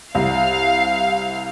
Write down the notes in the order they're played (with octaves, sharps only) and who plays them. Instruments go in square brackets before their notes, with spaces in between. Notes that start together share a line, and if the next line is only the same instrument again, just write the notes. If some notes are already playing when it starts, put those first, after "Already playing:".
[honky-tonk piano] C2 [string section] F5